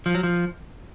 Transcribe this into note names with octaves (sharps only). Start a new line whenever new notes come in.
F3
F#3
F3